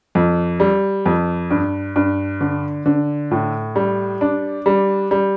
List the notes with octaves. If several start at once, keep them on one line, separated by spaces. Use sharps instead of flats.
F2
G3
F2
G2
G2
D3
D3
A2
G3
D4
G3
G3